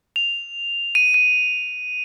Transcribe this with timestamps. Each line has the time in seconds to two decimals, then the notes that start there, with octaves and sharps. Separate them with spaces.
0.16 F7
0.95 D#7
1.14 D#7